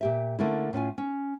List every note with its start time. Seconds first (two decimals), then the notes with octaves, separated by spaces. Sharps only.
0.01 A#2 G4 E5
0.39 D3 A3 A#3 C#4 E4
0.73 A2 C#4 F4 G#5
0.98 C#4